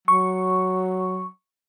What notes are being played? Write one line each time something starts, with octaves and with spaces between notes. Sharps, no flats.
F#3 C#6